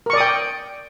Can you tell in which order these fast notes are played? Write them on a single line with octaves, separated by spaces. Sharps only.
A#4 C#6 D5 D#6 G5